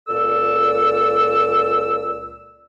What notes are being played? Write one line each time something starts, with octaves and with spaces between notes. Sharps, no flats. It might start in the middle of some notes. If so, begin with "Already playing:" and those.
C#2 A#2 A4 D5 E6